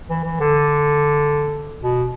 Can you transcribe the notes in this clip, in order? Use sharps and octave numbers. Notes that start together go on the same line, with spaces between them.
E3
E3
D3
B2